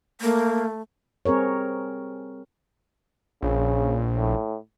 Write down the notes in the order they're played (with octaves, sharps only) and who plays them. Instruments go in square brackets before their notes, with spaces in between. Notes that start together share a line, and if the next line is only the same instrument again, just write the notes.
[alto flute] A3 [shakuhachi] A#3
[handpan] G3 C4 G#4 A#4 C#5
[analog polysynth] A#1 [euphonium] C#3
[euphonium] A2